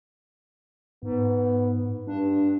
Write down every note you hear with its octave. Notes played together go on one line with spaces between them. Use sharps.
G#2 B3
G2 D4